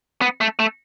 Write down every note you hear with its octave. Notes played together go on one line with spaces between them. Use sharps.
B3
A3
A3